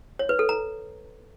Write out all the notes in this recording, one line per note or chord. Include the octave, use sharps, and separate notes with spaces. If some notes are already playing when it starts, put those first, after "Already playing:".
C#5
B4
A4
A#5